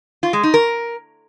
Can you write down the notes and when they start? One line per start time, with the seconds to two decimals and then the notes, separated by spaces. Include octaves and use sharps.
0.23 F4
0.33 G#3
0.43 D#4
0.54 A#4